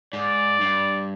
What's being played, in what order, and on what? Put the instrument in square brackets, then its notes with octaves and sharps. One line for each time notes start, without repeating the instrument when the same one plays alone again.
[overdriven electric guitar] G#2 [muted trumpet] D5
[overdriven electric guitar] G2